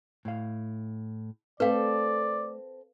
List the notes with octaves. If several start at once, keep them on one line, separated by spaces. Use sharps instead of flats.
A2 F5
A3 C4 A4 B4 D5 F5